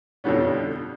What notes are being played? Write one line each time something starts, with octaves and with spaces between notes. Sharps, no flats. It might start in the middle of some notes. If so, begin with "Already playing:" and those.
F2 B2 D3 G3 B3 C#4